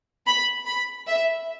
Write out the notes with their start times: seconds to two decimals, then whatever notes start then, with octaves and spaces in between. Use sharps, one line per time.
0.27 B5
0.67 B5
1.07 E5